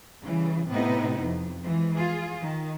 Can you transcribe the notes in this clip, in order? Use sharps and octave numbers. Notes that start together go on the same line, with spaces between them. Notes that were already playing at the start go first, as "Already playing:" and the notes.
C#3 E3 G3
A2 C3 B3 D#4 E4
F2
E3 F3 G#3
F4 G#4
D#3